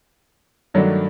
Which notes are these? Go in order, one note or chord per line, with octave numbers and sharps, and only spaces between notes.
G2 D#3 F#3 A3 D4